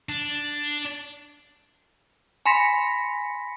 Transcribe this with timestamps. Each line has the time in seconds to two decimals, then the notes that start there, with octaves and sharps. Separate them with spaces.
0.09 D4
2.46 G#5 B5 C6 A#6 B6 C#7